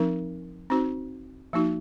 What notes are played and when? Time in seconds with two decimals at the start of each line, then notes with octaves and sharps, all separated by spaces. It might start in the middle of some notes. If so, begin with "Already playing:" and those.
Already playing: F3 C4 D#4 A#4
0.70 C4 D#4 F#4 C5
1.53 F3 A#3 D#4 F#4